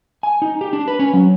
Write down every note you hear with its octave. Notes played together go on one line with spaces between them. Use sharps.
G#5
D#4
G4
D4
B4
C#4
F#3